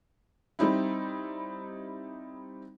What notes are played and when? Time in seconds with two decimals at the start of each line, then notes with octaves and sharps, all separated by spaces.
0.59 G3 C4 D#4 E4